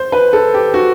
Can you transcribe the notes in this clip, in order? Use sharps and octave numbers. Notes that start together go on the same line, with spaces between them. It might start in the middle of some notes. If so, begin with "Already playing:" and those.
Already playing: C5
B4
A4
G4
F#4